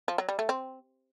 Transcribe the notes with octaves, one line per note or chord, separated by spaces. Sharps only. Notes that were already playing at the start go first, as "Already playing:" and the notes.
F3
F#3
G3
A3
C4